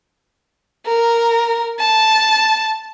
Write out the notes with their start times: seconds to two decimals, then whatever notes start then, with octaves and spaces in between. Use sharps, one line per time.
0.87 A#4
1.80 A5